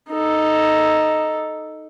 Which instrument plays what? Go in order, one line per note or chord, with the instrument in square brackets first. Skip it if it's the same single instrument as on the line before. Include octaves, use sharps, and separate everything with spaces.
[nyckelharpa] D#4 A4